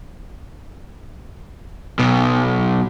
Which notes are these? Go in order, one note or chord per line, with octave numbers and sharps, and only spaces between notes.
B1 B2